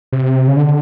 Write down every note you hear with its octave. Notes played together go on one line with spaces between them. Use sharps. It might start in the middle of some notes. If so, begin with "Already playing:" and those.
C3
C#3
D3